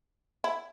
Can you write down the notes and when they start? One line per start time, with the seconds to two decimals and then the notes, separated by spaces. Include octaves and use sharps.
0.44 E4